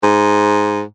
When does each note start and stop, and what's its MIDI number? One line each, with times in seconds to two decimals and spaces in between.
0.03 0.83 44